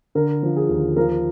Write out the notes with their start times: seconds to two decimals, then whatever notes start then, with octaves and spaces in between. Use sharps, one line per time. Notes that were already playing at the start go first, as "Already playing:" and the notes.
0.15 D3 A#4
0.43 F3
0.57 G#4
0.69 D#2
0.96 F3 A#4